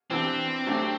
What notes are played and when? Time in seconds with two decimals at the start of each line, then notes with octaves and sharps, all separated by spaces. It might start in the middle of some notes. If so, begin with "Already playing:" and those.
0.10 E3 B3 C4 D4 G4
0.66 F#3 A3 D4 G4